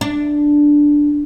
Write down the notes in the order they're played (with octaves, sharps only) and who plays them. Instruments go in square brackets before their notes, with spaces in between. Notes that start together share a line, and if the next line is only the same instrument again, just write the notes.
[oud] D4